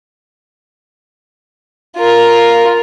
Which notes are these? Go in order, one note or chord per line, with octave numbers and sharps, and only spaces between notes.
F4 A#4